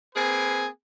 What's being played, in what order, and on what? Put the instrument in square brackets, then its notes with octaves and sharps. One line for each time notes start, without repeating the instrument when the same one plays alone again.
[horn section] A#3 C4 G#4 B4 G#5